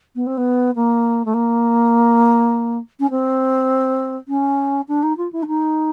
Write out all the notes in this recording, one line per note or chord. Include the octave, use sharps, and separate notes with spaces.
B3
C4
B3
A#3
A3
A#3
C#4
C4
C#4
D4
D#4
F4
E4
D4
D#4